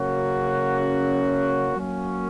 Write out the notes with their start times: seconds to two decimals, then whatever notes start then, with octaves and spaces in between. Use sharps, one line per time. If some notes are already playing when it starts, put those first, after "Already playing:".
Already playing: C#3 F#3 A#3 C#4 F#4
1.76 F#3 A#3 C#4